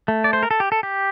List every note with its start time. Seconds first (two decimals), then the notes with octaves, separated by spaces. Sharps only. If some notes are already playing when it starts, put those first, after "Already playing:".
0.08 A3
0.24 D5
0.33 C5
0.43 A#4
0.51 A4
0.60 G4
0.72 A4
0.83 G4